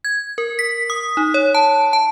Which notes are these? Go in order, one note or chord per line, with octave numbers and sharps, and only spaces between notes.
G#6
A#4
B6
D#6
D#4
C#5
A5
A5